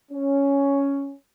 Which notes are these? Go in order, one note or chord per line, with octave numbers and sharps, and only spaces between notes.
C#4